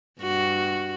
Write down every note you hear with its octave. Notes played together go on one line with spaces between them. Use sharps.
G2 F#4